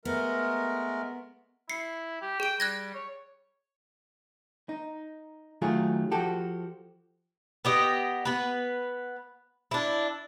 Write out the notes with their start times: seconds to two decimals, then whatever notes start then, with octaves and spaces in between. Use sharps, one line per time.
0.05 G#3 A3 B3 A#4
1.70 E4 C7 C#7
2.21 G4
2.40 G#4 G5 D7
2.60 G3 F#6 G#6 A#6
2.94 C#5
4.69 D#4
5.62 D#3 F#3 A3 F4 G#4
6.12 F3 F#4 G4 A4
7.65 B3 G4 D#5
8.25 B3 B4
9.71 D4 E4